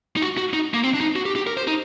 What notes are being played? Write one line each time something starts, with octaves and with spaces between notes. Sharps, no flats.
D#4
F#4
F#4
D#4
A#3
C4
D4
D#4
F#4
G4
G4
A#4
C5
D#4